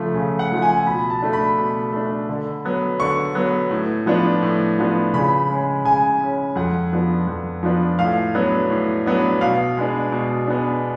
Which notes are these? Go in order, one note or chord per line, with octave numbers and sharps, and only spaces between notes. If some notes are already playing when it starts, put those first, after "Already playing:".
Already playing: C#3 F3 A3
C#3
F#5
F3 A3
G#5
B2 B5
A5
A3 D4
B5
B2
A3 D4
D3
F#3 B3
D3 C#6
F#3 B3
A2
F3 B3 D4
A2
F3 B3 D4
C#3 B5
G#3 C#4
C#3 G#5
G#3 C#4
F2 F#5
F3 B3 D4
F2
F3 B3 D4
A2 F5
F#3 B3 D4
A2
F#3 B3 D4
B2 F5
G#3 B3 D4
B2
G#3 B3 D4